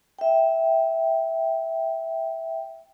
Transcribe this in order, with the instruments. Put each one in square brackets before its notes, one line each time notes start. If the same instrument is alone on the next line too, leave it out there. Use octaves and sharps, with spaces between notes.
[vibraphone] E5 G5